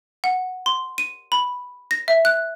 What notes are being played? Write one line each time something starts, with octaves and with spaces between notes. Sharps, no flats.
F#5
C6
D#7
B5
A#6
E5
F#6